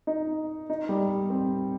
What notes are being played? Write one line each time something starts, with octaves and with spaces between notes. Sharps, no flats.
D#4
D#4
G3
C4